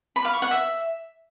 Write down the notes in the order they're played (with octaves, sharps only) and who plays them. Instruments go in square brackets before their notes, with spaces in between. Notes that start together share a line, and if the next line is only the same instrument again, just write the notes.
[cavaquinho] B5
F5
C#6
F#5
E5